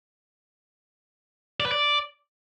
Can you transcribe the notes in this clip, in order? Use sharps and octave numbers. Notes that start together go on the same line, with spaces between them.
D5
B4
D5